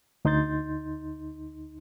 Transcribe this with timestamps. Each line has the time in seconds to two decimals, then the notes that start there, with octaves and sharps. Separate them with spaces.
0.25 D2 D#4 C6 G6 A6